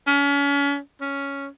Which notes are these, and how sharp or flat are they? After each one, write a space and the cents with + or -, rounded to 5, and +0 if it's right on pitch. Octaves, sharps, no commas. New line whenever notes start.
C#4 +35
C#4 +5